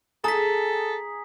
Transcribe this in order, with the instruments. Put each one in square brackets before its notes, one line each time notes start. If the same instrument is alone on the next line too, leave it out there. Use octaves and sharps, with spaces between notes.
[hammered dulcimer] G#4 [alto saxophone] A4 [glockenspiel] A#5 B6